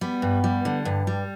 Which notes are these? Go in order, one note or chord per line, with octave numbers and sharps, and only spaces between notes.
G3 B3
G2
G3
D3
G2
G3